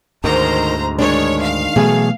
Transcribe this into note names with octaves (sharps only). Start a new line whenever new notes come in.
D2 G#2 D#3 C5 A#5
D#3 G#3 D4 C#5
F5
B2 E3 F#3 A3 B3 G#4